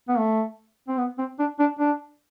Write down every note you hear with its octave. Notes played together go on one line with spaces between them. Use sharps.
B3
A3
C4
B3
C4
D4
D4
D4